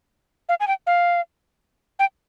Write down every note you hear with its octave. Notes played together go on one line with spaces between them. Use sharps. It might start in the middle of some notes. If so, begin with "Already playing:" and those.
F5
G#5
G5
F5
G5